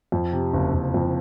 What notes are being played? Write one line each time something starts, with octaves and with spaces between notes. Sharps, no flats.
F2
C3
F#1
F#1
F2